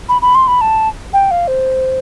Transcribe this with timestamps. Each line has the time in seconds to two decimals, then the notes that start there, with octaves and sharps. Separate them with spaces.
0.09 B5
0.22 B5
0.35 C6
0.47 B5
0.61 A5
1.13 G5
1.31 F5
1.48 C5